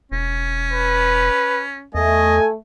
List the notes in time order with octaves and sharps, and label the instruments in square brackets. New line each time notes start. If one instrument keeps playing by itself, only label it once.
[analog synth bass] E1 [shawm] C#4
[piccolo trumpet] B4
[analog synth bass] E2 [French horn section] A3 [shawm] D#5 [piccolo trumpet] G#5